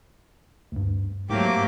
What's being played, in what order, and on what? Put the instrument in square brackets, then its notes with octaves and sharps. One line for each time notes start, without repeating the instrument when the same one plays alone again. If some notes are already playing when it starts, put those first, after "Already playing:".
[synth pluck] D2 G2
[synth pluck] G#2 [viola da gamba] F#3 A3 C4 [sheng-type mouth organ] A#3 G4 D6